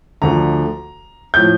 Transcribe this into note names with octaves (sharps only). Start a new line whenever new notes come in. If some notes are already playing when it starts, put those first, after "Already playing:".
D2 D3 F3 A#5
A2 F3 G6